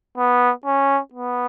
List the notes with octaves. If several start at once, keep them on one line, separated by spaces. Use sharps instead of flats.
B3
C#4
B3